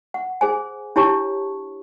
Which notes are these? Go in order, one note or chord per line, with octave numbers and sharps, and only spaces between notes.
F#5
G#4 C5 G#5
D4 E4 G4 C#5 A5 C#6